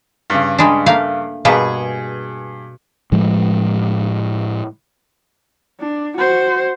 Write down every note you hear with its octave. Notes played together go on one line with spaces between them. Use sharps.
G2 C#3
G3 G#3 D4
A3 A#3 F5
G2 B2 A#3 B3 G#4
A2 F3 G#3
D4
F#4 C5